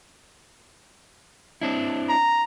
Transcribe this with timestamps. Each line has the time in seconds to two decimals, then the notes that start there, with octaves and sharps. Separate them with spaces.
1.61 C4 D4 E4
2.09 A#5